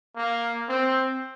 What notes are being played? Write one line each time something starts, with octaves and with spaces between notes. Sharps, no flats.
A#3
C4